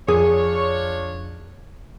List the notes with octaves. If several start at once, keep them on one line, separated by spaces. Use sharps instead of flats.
F2 D4 F4 G#4 C#5